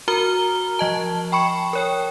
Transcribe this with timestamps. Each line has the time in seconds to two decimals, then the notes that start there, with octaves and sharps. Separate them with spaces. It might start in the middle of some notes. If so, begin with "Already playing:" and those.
0.08 F#4 A#4 A#5 F6 G7
0.79 F3 D#5 A5
1.32 G5 B5 C#6 C#7
1.73 A#4 C#5 G5